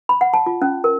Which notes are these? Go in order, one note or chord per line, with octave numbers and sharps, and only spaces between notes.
B5
F#5
A5
F4
C#4
A#4